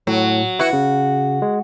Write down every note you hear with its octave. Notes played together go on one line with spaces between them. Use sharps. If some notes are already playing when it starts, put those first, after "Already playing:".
A2 F#3
E4 F#4 B4 C#7
C#3
G#3